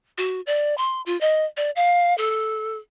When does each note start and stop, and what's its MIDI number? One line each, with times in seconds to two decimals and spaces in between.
0.18 0.41 66
0.47 0.75 74
0.78 1.02 84
1.06 1.19 65
1.21 1.45 75
1.57 1.71 74
1.76 2.16 77
2.18 2.77 69